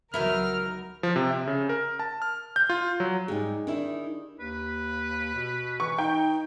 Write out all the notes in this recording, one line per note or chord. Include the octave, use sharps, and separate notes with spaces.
C#2 D#3 F#3 B3 E4 A#4 F6
F3
C3
E5
C#3
A#4
A5
F6
G6
F4
F#3
G#2 G3 D#4 G4 G#4
D#3 D4 E4
D#2 B4
B2
E3 C#6
D#4 G5